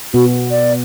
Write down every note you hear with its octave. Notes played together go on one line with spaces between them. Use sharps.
B2 B3 F#4
D5